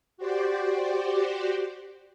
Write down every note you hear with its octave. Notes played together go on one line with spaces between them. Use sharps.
F#4 G4 C5 D5